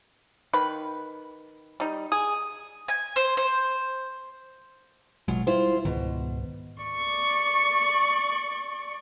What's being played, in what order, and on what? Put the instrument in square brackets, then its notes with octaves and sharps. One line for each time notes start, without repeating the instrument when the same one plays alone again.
[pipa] D#3 B4 B5
G3 D#4
[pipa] G#4 [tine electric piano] D#6
[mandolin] G#5
C5
C5
[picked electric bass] A1 B2 G#3 [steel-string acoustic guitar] F#3 F4
[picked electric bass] G3 [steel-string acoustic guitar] E4 F4 C5
[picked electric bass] C#2 G#2 D#3 [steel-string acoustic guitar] B2
[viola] D5 C#6